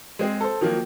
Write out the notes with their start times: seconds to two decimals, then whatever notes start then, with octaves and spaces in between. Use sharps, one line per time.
0.19 G#3 C4 G#4
0.41 A4 C5
0.61 D#3 F3 F#3 A#3